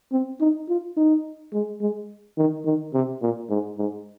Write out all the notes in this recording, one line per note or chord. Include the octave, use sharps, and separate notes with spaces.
C4
D#4
F4
D#4
G#3
G#3
D#3
D#3
C3
A#2
G#2
G#2